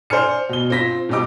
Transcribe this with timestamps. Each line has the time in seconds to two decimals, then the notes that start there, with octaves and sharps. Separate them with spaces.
0.10 C5 D5 G#5 F6 C#7
0.49 B2 G7
0.70 C4 F4 A#6 B6
1.09 D#1 B2 G4 D#5 D6